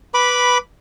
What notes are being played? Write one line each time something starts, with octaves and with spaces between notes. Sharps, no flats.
B4 B5 D6